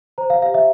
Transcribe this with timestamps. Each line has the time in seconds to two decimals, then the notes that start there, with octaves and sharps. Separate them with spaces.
0.18 C5 A#5
0.30 F5
0.42 G4 F5
0.54 E5